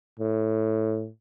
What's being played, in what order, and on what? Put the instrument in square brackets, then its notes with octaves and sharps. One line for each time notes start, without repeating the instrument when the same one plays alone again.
[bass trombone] A2